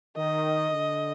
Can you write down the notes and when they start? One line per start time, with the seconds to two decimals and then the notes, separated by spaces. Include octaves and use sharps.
0.17 D#3 D#5
0.71 D3